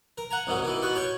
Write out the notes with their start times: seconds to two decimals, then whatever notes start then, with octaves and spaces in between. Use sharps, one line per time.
0.18 A#4
0.31 F#5 G#5 A#5
0.47 C2 G#2 D#3 F#3
0.62 B2 D#3 E3
0.82 B2 B3 F#4
0.95 C#5 G5 G#5